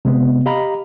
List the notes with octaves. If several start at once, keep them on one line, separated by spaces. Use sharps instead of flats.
C3 G#3 B3 C4
G4 D#5 F5 A#5 B5